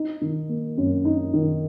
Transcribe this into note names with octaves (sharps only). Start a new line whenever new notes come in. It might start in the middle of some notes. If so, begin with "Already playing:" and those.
Already playing: D#4
D#3
A#3
F#2
D#4
D#3